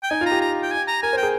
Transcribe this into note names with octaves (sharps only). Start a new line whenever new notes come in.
G5
D#4 G#5
F4
A#5
G4
A#5
G5
G#5
A#5
A#4 G#5
C5
G5
G#4